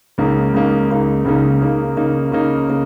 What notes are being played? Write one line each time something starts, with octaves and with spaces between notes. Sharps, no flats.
C#2 C#3 A#3 D#4
C#2 C#3 A#3 D#4
C#2 C#3 A#3 D#4
C#2 C#3 A#3 D#4
C#3 A#3 D#4
C#3 A#3 D#4
C#3 A#3 D#4
C#3 A#3